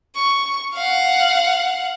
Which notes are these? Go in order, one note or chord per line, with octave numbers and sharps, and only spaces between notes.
C#6
F5 F#5